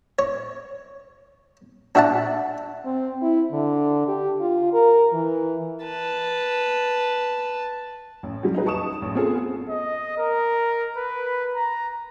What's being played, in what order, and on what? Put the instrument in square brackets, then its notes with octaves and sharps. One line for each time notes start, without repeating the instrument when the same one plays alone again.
[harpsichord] C#5
D4 F#4 E5 F#5 A5
[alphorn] C4
E4
D3
G4
F4
A#4
E3
[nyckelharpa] B4 A5
[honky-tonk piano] A1
F#3 G3
D#4 G#4 B4
A5 C#6 D#6 E7
A1
B3 C4 F4 G#4 A4
[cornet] D#5
A#4
B4
A#5